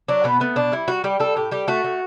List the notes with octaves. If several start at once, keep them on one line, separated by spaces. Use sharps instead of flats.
F#3 D4
B2 B3
A3 B3
B2 D4
G3 E4
G3 F#4
G3 G4
G3 A4
A2 G4
G3 G4
A3 F#4
A3